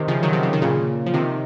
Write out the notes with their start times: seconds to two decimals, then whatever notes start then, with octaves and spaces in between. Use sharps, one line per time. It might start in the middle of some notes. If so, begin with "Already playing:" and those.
Already playing: C3 D#3
0.08 C#3 F3
0.23 D#3 F#3
0.33 C3 D#3
0.43 C#3
0.53 D#3
0.62 A#2 C#3
1.06 F3
1.14 C3 D#3